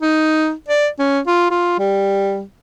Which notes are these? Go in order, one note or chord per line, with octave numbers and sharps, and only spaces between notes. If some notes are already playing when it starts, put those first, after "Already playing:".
D#4
D5
C#4
F4
F4
G3